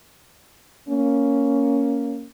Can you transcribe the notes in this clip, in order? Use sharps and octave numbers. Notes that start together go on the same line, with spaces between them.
A#3 C#4